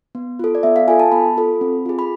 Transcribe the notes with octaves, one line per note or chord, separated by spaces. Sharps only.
B3
F4 A4
D5
B3 E5
F5
F4 A4 G#5
A5
B3 B5
F4 A4
C4
F4 G#4
B5